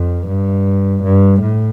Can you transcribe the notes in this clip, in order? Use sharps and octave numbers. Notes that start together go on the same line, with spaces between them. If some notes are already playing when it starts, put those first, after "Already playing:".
Already playing: F2
G2
G2
A2